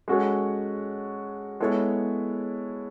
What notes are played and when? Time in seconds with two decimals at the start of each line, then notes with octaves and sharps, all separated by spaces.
0.08 G#3 C#4 F#4 A4 C#5
1.60 G#3 B3 E4 A4 C#5